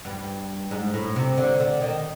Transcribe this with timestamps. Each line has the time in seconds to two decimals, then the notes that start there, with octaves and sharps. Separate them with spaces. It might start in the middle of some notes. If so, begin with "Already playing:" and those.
0.05 G2
0.71 G#2
0.94 A2
1.16 C3
1.37 D3
1.60 D3
1.81 D#3